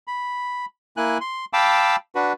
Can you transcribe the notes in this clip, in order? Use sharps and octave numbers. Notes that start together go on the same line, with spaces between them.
B5
A#3 E4 G#5 F#6
C6
F5 G5 A5 B5 D6 E6
D4 F#4 B4